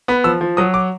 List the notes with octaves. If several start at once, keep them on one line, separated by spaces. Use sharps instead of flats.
B3 B5
F3 E6
F3
F#3 D#6
D6